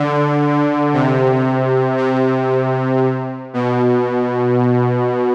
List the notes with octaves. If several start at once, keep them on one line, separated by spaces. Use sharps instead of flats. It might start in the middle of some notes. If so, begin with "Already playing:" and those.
Already playing: D3
C3
C3
B2